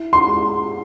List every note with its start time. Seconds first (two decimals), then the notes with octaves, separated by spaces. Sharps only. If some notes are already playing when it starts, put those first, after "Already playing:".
Already playing: E4
0.13 C6
0.27 G#3